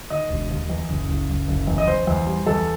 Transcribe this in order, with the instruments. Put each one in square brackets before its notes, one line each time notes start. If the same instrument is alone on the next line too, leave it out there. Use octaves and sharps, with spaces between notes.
[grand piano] D#3 D#5
E1
D#2
E2
F#1
F#1
F#1
F#1
E2
D#5
E2 C5
E2
G3
E2 A4